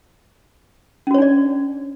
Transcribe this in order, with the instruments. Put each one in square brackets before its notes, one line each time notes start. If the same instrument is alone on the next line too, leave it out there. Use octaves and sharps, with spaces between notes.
[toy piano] C#4
F#4
C#5
D4
D5